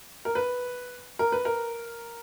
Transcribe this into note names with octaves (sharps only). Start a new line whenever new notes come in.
A#4
B4
A#4
B4
A#4